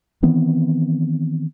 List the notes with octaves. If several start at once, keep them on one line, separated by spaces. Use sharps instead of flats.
D#3 E3 B3 C4